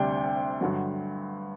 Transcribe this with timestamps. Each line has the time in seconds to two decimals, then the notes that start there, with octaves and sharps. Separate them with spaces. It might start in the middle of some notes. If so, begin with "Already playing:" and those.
Already playing: D2 C3 G3 D4 G5
0.61 G2 D3 F#3